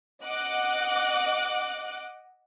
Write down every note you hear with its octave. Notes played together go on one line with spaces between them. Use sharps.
D#5 F#5 D6 F#6